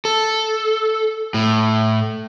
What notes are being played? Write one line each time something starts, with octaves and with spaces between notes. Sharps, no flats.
A4
A2